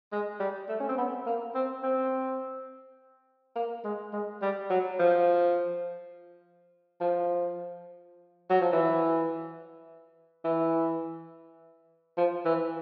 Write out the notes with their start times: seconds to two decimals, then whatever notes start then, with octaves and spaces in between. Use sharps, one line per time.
0.12 G#3
0.40 G3
0.69 A3
0.80 C#4
0.89 C4
0.98 B3
1.26 A#3
1.55 C4
1.83 C4
3.56 A#3
3.84 G#3
4.13 G#3
4.42 G3
4.70 F#3
4.99 F3
7.00 F3
8.50 F#3
8.61 F3
8.72 E3
10.44 E3
12.17 F3
12.45 E3